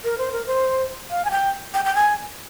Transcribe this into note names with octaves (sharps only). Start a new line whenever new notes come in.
A#4
C5
A#4
C5
F5
G#5
G5
G5
G5
G#5